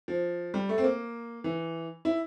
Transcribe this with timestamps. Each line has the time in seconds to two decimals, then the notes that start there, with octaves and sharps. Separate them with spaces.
0.08 F3
0.54 G3
0.69 A3
0.78 C4
0.84 A#3
1.44 E3
2.05 E4